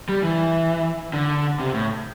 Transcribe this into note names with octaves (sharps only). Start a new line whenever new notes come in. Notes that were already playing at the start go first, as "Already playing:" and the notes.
G3
E3
D3
C3
A2